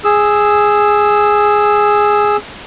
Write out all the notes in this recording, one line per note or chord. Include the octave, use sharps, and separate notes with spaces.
G#4 E6